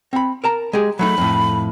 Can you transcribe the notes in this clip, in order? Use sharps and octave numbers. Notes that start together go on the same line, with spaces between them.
C4 B5
A#4 A5 A#5
G#3 G4 G#4
F#3 A3 D#4 B5
F2 A2